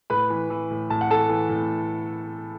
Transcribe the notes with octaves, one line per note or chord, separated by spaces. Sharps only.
A2 B4 B5
E3
E3
A2
A2 A5
F#5
E3 A4 A5
E3
A2